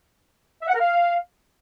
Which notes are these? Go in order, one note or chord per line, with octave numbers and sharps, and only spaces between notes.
E5
F#5
A#4
F5